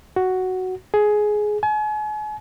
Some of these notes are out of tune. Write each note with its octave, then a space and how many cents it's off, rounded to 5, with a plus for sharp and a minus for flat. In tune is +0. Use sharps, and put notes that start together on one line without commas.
F#4 +5
G#4 +15
G#5 +40